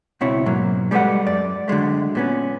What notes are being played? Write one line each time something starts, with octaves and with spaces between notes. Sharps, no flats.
C#2 B2 C4 E4 C#5
G#2 B2 F#3 A#3
G3 G#3 G4 A4 B4 F#5
F#2 D5
D3 F#3 G#3 A3
A#2 B3 C#4